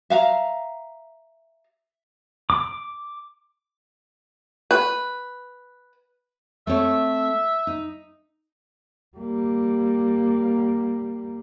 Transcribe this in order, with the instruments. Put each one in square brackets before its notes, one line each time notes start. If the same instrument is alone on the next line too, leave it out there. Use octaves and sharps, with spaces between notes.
[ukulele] E5 F5 A#5
[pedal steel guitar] D6
[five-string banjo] B4
[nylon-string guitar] A3 C4 C#5 [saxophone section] E5
[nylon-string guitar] D#4
[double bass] G3 A#3